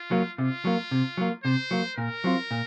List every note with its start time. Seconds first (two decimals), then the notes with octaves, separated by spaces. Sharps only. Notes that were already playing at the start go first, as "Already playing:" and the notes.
Already playing: F4
0.11 F#3 A#3
0.38 C3 F4
0.65 F#3 A#3
0.91 C3
1.17 F#3 A#3
1.44 C3 C5
1.71 F#3 A#3
1.97 A#2 A#4
2.24 F#3 C4 F4
2.51 A#2